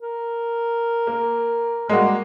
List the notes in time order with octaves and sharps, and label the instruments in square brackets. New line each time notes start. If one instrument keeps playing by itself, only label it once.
[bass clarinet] A#4
[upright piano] A#3
[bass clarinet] G3 [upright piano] G#3 A#3 F#4